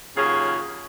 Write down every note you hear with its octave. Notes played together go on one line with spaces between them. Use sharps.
D#2 C#3 F#3 C#4 F4 G#4